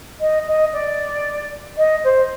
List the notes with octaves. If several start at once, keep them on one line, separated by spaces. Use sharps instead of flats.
D#5
D#5
D5
D#5
C5